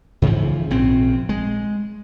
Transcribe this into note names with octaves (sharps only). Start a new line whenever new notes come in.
G#2 C#3 E3 F3
A#1 C#3 C4
G#3